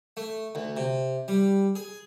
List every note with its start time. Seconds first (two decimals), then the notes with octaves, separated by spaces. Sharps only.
0.17 A3
0.55 D2
0.77 C3
1.28 G3
1.75 G#4